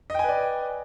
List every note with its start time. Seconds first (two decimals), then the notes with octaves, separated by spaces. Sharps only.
0.10 D#5
0.14 G5
0.19 G#5
0.24 B4
0.29 D5